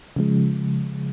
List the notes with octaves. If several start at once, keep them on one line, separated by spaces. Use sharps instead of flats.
C#3 F3 G#3